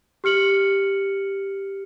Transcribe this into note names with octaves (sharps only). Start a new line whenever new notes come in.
G4 F6 C#7 F#7